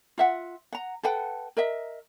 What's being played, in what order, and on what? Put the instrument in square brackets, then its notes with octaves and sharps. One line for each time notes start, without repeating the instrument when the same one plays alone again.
[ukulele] F4 E5 F#5
F#5 A#5
A4 B4 F#5 G5
A#4 D#5 E5